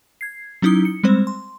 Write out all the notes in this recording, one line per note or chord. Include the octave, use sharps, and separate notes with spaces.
G#6 C7
F#3 C#4 D#4 E4 D#6 G7
C#7
G3 G#3 C4 C5
C6